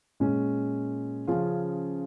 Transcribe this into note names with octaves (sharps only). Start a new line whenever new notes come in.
A#2 G#3 C#4
C#3 F3 C#4 F4 G#4